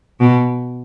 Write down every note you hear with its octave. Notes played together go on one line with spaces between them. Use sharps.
B2